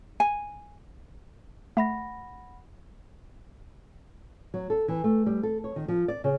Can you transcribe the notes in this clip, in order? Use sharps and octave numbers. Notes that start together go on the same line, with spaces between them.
G#5
A3 F#5 B5 A#6
F#3
A4
E3
A3
G3
A4
C#5
D#3
F3
D5
C#3